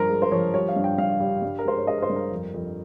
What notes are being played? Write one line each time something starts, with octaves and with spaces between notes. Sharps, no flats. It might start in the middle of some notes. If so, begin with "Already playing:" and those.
Already playing: G2 F3 A#4 C5
G#3
C5
F3 C#5
G3 C#5
F5
G2
G5
G2 F5
G3
G2
A#4
G#3 C5
C#5
G#3 D#5
A#4
C5
G2
A#4
F2
F2